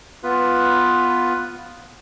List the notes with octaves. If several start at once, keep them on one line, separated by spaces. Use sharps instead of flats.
B3 F4 B4